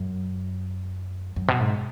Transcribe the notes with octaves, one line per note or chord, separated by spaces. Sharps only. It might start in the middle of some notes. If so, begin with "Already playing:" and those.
Already playing: F#2
F#2
B2
G#2